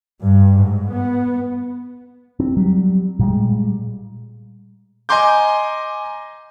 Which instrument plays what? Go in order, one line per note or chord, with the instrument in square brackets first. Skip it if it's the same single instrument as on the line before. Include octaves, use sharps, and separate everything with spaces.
[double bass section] G2
G#2
B3
[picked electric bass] C4
F#3 G3
A#2 G3 G#3
[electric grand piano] D#5 G#5 A#5 C6 D6 G6